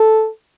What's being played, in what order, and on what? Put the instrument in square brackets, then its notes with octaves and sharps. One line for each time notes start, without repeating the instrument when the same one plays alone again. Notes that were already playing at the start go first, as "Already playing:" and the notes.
Already playing: [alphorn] A4